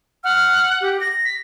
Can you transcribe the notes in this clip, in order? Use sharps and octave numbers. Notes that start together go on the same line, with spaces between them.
F#5 F6
G4
A#6
B6